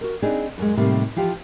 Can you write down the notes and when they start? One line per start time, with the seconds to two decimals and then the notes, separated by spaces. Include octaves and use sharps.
0.01 F#4 A#4
0.22 C4 D4 D#4 G#4 B4 D5
0.58 F#2 G#3
0.77 A2 C3 D#3 G3 A#3
1.16 E3 F3 F4 G4